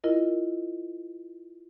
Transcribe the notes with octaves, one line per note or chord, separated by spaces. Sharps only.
E4 F4 A#4 D#5